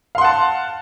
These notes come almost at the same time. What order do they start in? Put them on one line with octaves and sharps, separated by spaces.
F5 C6 F#5 A5